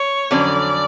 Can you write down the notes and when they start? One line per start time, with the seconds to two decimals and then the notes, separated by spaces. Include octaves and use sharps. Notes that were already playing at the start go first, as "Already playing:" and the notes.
Already playing: C#5
0.31 F2 D3 F#3 C#4 D5